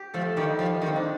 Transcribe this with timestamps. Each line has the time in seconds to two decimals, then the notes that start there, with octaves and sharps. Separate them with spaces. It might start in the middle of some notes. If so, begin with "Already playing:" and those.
Already playing: G4
0.14 F3 A3 A4
0.36 D#3 G3 G4
0.59 F3
0.82 D#3
0.86 C4
0.96 D4